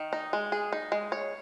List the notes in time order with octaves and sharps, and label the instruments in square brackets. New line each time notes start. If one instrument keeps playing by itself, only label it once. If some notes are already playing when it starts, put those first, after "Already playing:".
Already playing: [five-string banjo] D#3
D#4
G#3
G#4
D#4
G#3
C#5